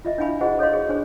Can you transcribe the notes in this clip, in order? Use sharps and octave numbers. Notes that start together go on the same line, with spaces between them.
F4 D#5 E5
D4 E4 F5 G#5 B5
F4 F#4 G#4 C5 D#5 F#5
A4 C#5 D#5 F5 C6
F#4 G#4
D4 G#4 C5 G#5